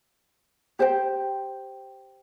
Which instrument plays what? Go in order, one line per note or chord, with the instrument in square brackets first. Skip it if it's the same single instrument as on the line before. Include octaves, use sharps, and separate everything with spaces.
[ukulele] G4 C5 G5